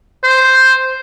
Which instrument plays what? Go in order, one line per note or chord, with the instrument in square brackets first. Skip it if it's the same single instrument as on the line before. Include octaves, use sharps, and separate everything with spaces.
[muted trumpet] C5